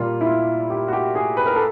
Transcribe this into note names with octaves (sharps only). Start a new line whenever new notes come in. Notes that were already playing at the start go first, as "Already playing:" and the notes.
Already playing: A#2 G3 A#3 F4
E4
F4
G4
F#4
G4
G#4
B4
A#4
A4